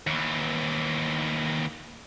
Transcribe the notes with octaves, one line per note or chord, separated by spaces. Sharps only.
D#2 E3